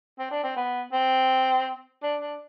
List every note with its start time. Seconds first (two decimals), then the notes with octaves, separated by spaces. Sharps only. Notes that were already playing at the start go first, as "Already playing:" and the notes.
0.19 C4
0.31 D4
0.43 C4
0.56 B3
0.93 C4
2.03 D4
2.21 D4